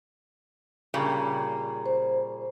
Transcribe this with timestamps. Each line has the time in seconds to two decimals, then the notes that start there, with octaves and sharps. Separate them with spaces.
0.94 A#2 C#3 G3
1.86 C5